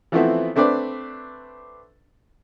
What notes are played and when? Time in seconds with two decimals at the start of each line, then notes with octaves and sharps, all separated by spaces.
0.12 E3 F3 A3 B3 C4 E4
0.56 A3 C4 D4 B4 D5